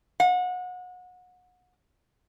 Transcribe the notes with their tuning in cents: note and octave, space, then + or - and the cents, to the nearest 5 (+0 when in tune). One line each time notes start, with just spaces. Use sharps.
F#5 -30